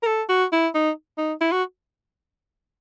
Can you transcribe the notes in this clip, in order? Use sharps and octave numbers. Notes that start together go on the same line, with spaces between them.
A#4
A4
F#4
E4
D#4
D#4
E4
F#4